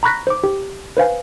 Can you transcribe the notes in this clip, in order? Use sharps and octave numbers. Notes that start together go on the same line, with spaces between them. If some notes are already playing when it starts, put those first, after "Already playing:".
A#5 B5 C#6 F#6 A#6 B6
C5 D6
G4
B4 C5 F5 G#5